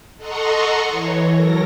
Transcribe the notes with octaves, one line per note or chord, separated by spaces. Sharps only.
A4 D#5 F#5 A#5 C6 C#6
E3 C#5
F#3 A4 A#4 A#6